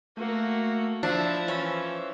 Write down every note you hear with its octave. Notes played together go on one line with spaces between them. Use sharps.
A3 A#3 F#4
F3 D4 E4 C5 E5
E3 C#4